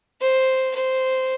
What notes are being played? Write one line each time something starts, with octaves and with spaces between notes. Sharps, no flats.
C5
C5